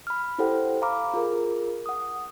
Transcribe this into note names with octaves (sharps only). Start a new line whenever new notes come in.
B5 F6
E4 G4 A4 C5 F#5 G5
F5 A#5 B5 D6 F6
F4 G#4 A#4
F#5 D#6